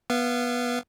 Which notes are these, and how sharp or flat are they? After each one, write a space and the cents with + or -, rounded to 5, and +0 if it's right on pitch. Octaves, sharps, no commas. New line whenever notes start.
B3 -15 F5 -30